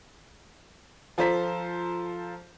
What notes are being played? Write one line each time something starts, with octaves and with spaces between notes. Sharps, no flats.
F3 F4 A4 C5 A#5 B6